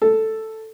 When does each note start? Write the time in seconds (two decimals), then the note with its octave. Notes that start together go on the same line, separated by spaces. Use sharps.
0.02 A4